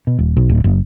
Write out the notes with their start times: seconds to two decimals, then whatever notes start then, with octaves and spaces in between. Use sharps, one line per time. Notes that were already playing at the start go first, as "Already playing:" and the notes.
0.07 B2
0.19 D#1
0.37 B1
0.50 D1
0.64 F#1